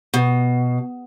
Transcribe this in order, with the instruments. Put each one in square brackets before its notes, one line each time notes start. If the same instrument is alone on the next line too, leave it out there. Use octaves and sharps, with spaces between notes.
[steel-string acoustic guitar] B2